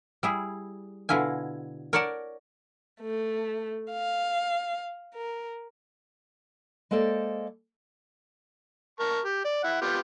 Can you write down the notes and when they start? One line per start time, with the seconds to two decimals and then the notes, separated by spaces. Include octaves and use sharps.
0.23 G3 E4 G#4
1.09 B2 D3 E4 F4 G#5
1.93 A#4 C#5 D5 F#5 A5
3.01 A3
3.92 F5
5.15 A#4
6.91 G#3 A#3 A4 C5 D5
9.00 A#4 A5 C#6
9.25 G4
9.45 D5
9.64 E4 F#5
9.82 B3 F4 G4